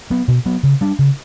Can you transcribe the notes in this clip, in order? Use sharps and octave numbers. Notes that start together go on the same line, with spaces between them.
F#3 B3
B2
F#3 B3
C#3
G3 D4
C#3